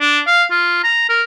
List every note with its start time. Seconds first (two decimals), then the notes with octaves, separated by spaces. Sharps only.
0.01 D4
0.27 F5
0.51 F4
0.84 A#5
1.10 A#4